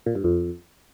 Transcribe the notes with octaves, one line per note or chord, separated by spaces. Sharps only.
A#2
G2
F2